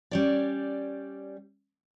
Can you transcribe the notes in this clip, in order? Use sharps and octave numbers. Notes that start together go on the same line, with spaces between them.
G3 C#4 D5